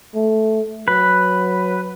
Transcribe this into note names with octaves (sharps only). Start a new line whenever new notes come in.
A3
F#3 B4